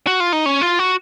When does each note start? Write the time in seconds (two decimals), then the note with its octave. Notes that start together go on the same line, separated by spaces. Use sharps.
0.07 F#4
0.20 F4
0.33 D#4
0.46 C#4
0.61 F4
0.79 F#4